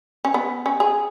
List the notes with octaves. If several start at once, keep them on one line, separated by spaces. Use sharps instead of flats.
C#4
B3
C#4
G#4